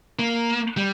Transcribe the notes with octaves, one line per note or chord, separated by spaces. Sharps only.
A#3
G3